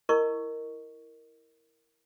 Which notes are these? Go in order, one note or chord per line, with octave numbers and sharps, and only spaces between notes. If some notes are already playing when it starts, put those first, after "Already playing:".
E4 A#4 D#5 C#6